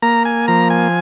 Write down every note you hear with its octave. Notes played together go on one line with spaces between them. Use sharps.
A#3 A#5
G#5
F3 A#5
G#5